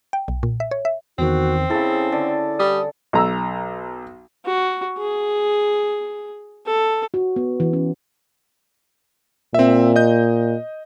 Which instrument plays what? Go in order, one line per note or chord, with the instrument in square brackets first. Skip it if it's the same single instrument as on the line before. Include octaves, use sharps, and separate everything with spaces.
[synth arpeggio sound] G5
B1
A#2
E5
C#5
E5
[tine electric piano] E2 D#3 [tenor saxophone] C4 [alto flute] F#4
[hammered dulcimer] C#3 A4 [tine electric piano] E4 [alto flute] G#4
[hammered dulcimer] D3 [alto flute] D5
[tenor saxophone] G3 [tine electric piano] D#6
[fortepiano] B1 A#5 E6
[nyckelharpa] F#4
G#4
A4
[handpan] F#4
B3
E3
C#4
[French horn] A#2 [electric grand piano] C4 E5
[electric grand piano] D#5 G6